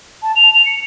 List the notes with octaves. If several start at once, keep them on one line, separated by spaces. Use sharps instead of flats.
A5
F7
F7
C#7